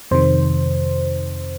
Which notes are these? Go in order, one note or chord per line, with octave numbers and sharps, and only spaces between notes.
F2 C3 D#3 C5